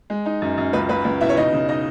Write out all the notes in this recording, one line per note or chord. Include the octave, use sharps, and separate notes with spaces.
G#3
D#4
F#2
F#2
C#2 B4 B5
C#2 B4 B5
C#2
B2 E4 E5
C#5
C#3 D#4 D#5
C#3
D#4 D#5